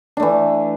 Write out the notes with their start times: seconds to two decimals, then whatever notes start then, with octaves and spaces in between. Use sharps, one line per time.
0.17 D4
0.20 A3
0.22 E3